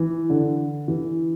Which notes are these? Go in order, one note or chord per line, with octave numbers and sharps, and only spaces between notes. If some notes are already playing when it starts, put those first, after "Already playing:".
Already playing: E3
D3
E3